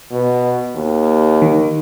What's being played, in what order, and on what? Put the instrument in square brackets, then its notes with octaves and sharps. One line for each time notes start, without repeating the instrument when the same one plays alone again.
[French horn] B2
D#2
[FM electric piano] D#3